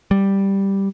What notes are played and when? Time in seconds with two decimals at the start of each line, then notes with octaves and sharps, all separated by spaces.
0.11 G3